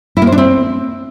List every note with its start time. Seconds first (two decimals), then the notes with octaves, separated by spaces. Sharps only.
0.17 E4
0.22 A#3
0.27 C5
0.32 D4
0.38 C4